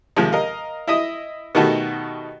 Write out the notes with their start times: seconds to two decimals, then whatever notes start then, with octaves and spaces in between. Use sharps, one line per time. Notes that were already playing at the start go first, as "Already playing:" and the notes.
0.16 D#2 C3 F3 G#3
0.32 A#4 D#5 F5
0.88 E4 D#5 E5 D#6
1.55 B2 D#3 A3 F#4 G4